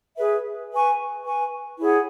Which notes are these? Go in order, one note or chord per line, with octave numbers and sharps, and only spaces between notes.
G#4 B4 E5
B4 G#5 C#6
B4 G#5 C#6
E4 G#4 C#5 F#5